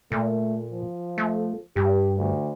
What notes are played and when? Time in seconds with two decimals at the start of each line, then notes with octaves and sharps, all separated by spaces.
0.12 A#2 A3
0.71 F3
1.18 A3
1.76 G2 G4
2.18 D2